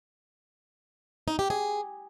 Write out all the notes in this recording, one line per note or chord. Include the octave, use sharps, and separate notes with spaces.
D#4
G4
G#4